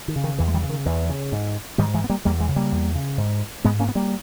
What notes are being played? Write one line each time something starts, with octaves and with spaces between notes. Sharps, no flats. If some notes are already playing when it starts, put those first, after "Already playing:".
D#3
C#3
D#3
E2 E3
G#3
D#3 G3
C#3
D#3
E2 E3
C#3
G#2
G#2 D#3 G3
E3 G#3
B3
G3 A#3
E2 G3 A#3
E3 G#3
C#3
G3 A#3
E2
C#3
G#2
G#2 G#3 B3
A#3 C#4
B3
G3 A#3